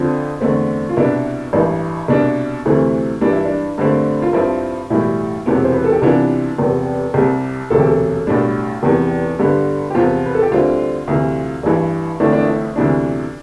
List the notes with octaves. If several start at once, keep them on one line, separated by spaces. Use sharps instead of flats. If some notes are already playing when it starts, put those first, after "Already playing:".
Already playing: F2 D3 F3 F4
E2 D3 A3 C4
F4
C2 B2 B3 D4 E4
A1 G2 E3
C2 B2 B3 D4
D2 C3 E3 A3 C4
G2 E3 G3 D4
E4
D4
G2 D3 A3 C4
F4
G2 F3 C4 E4
B1 A2 E3 G3 E4
E1 E2 C3 E3 B3
C5
B4
A4
G4
C2 C3 E3 B3 D4 F4
F1 E2 C3
C2 C3 G3 G4
E1 D2 C3 A4
G4
A4
B1 A2 G3 D4
F1 E2 C3 E3 G4
G2 D3 G3 B3
G4
E2 C3 F3 B3 F4
B4
A4
G4
D2 D3 G3 C4 F4
D2 C3 E3
A1 G2 E3
G1 F2 E3 A3 D4 E4
D4
E4
D2 C3 E3 B3 D4